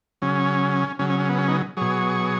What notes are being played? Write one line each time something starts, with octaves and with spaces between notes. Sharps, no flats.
C#3 F#3 C#4
C#3 F#3 C#4
C#4
C#4
B3
C#4
B3 D#4
B2 F#3 G#4 C#5